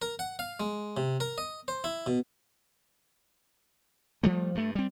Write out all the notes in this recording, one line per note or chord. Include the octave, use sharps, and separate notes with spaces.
A#4
F#5
F5
G#3
C3
A#4
D#5
C5
E4
B2
F3 G3 A3
G2 A3
G3 C4